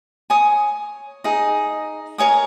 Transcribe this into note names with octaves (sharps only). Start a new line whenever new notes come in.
C#5 G#5 D#6
D#4 G#4 D#5
A#4 C#5 G#5 D#6